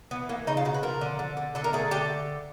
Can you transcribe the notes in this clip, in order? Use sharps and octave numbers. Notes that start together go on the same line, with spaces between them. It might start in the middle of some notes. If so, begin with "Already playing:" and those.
E3 B3
E3 A#3
C#3 D#4
F4
C#3 F#4
B4
F3 A#4
D3
D3
D3
D3 A4
A#4
A3 G#4
D3 G4